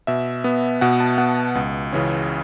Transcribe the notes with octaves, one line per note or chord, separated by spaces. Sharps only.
B2 E5
B3
B2 F#5
A5
B3 F#5
C#2
C#3 E3 C#4